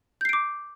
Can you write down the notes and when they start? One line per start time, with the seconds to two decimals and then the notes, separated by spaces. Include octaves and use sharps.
0.21 G6
0.25 C7
0.29 D7
0.33 D6